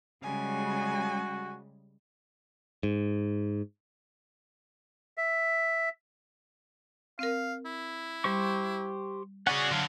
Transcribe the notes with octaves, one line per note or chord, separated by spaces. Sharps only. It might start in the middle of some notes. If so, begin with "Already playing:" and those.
C#3 G3 G#3 F#4 G#5
G#2
E5
C4 A#4 F5
E4
G3 G4 C5 C#6
C#4 F#4 G#4 D5 F#5 C#6
D3 F#3 F5